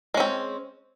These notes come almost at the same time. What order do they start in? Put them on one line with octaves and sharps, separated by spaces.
G#3 C#4 C4